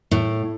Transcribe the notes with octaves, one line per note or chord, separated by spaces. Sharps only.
A2